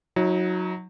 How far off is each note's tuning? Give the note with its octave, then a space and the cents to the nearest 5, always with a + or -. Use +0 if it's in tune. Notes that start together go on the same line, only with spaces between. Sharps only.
F#3 -15 D#4 +35